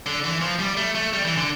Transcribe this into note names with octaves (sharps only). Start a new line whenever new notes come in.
D3
E3
F3
G3
A3
A3
G3
E3
D3